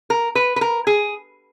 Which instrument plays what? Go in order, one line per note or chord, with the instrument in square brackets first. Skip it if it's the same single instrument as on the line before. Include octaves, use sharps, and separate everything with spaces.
[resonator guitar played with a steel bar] A#4
B4
B4
A#4
G#4